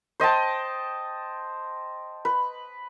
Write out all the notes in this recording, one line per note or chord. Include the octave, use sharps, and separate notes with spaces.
C5 D#5 G5 A5
B4